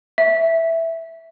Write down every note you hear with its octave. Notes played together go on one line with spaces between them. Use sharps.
E5